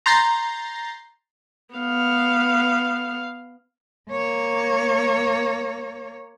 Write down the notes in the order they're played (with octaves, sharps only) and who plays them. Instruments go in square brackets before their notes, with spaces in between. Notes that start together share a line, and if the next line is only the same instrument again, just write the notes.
[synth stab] A#5 C6 G6 A6 A#6 C7
[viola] B3 F5
[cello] A#3 C#5